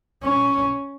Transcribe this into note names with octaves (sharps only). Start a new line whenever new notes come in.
C#4